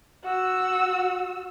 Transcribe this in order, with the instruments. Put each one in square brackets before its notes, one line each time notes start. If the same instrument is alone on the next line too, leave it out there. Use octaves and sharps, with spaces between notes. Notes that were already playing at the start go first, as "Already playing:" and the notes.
[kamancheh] F#4 E6